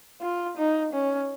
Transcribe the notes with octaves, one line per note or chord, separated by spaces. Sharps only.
F4
D#4
C#4